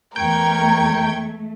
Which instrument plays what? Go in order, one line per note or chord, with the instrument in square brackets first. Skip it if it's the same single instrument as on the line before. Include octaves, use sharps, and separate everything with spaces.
[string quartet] E2 C#6 G#6 [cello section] A3 [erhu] A#4 [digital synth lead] G5